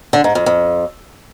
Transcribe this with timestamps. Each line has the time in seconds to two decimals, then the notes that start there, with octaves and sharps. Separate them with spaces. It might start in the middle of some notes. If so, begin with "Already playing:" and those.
0.13 D3
0.24 G#2
0.35 F2
0.46 F2